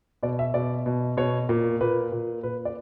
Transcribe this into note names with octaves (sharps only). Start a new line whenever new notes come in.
B2 D5
E5
B2 D5
B2
B2 C#5
A#2
A#2 B4
A#2
A#2 B4
D5